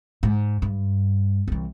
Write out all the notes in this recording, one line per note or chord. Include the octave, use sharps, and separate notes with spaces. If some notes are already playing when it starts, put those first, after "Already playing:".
G#2
G2
C2 E3